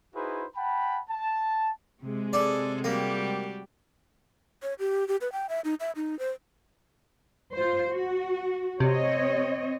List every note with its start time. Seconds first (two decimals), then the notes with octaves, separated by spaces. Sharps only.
0.14 D#4 E4 F#4 G#4 B4 C5
0.55 F#5 G5 A5 B5
1.10 A5
2.02 C3 G#3
2.33 G#4 A4 D5
2.84 G3 A#3 F#4 G4
4.63 C#5
4.79 G4
5.08 G4
5.21 B4
5.32 G5
5.49 E5
5.65 D#4
5.80 E5
5.96 D#4
6.19 C5
7.57 F4 C5
7.91 F#4
8.80 C3 C4 C#5 D#5